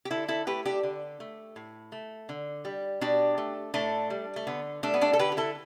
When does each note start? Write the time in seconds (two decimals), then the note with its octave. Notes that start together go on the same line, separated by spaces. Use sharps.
0.05 G4
0.11 D3 E4 A4
0.28 E4 A4
0.47 A3 G4 B4
0.65 D4 G4
0.83 D3
1.20 A3
1.56 A2
1.92 A3
2.29 D3
2.65 G3
3.01 B2 D4 G4
3.38 A3
3.74 A2 A3 D4
4.10 G3
4.36 A3
4.47 D3 B3
4.83 G3 A3 D4
4.94 B3
5.01 A3 D4
5.13 A4
5.19 D3 G4 B4
5.32 G4
5.37 E4 A4